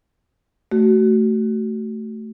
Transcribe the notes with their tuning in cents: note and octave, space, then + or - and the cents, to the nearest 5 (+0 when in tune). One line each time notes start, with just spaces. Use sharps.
A3 +0 F#4 +25